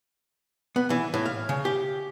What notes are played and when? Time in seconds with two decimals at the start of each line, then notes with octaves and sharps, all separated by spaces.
0.76 B3
0.90 E3
1.14 A2
1.26 F5
1.49 C#3
1.65 G4